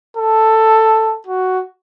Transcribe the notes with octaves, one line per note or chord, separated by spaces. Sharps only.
A4
F#4